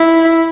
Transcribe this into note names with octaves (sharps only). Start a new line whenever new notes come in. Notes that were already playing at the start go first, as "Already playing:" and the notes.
Already playing: E4